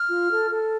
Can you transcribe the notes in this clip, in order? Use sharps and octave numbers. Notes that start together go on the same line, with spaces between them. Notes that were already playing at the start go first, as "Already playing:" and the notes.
Already playing: F6
F4
A4
A4